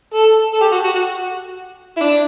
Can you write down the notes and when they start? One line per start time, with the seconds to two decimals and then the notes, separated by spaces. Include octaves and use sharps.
0.14 A4
0.54 A4
0.61 G4
0.72 F#4
0.84 F#4
0.95 F#4
1.97 E4
2.01 D4